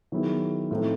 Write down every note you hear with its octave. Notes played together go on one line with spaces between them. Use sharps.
D#3 F#3 B3 E4 G#4
A2 F3 A3 C4 D#4